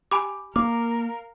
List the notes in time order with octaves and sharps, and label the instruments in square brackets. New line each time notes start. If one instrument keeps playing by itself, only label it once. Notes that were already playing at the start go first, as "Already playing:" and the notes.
[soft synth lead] G4 [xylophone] G#5 B5 D6
[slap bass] A#3 [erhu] A#4 [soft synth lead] F5 [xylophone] D6